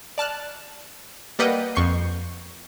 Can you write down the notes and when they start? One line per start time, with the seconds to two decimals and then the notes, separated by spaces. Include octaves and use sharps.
0.18 D5 A5 F6 F#6
1.39 G3 A#3 B4 D#5 F#5 G5
1.75 F2 C#6 G6 C7